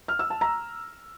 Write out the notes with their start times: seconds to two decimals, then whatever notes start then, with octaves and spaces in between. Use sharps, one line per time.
0.08 F6
0.19 E6
0.30 A5
0.41 A#5